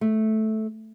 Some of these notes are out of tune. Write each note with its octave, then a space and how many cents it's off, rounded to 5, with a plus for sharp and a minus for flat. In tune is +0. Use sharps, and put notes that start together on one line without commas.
A3 -10